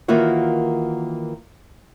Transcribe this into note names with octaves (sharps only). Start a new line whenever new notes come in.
D#3 E3 A#3 F4 F#4 C#5